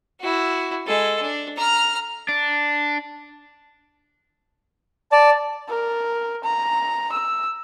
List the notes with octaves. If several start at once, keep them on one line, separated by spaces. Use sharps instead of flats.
E4 F#4
G#3 A4
D4
A#5 F6
D4
D5 A5
A#4
A#5
E6